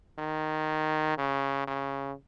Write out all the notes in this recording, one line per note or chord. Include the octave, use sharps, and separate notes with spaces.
D#3
C#3
C#3